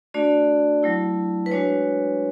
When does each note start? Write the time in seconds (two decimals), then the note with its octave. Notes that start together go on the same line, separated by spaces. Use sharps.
0.14 A3 D4 F#4 D5
0.83 F#3 A3 E4
1.46 B4
1.51 G#3 D4 F#4 C#5